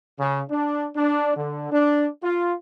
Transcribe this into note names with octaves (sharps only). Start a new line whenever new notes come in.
C#3
D4
D4
D3
D4
F4